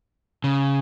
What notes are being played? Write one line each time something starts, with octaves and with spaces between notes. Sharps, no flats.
C#3